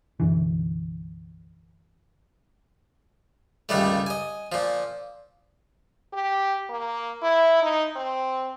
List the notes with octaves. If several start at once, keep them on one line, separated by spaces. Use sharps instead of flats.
B1 F#2 D3 E3
C#2 G2 D#3 G3 A3
D#5 G#5
A#2 F3
G4
A#3
E4
D#4
C4